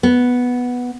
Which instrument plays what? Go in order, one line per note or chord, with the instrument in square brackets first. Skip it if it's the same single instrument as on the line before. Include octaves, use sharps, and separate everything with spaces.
[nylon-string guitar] B3